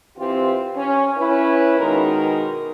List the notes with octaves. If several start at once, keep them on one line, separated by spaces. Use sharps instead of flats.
E3 C4 F4 G4
C#4
C#4 E4 B4
B2 D#3 G#3 A#4